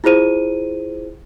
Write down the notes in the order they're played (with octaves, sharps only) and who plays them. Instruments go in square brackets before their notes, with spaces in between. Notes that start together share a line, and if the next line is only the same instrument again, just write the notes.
[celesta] E4 F4 G#4 C5 D#7